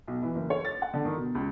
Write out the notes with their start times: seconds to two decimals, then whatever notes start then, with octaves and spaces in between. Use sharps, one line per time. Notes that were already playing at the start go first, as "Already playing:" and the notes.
0.08 B1
0.22 E3
0.35 F#1
0.50 C#5
0.65 A6
0.82 F#5
0.94 D3
1.05 D#3
1.17 B2
1.35 C#2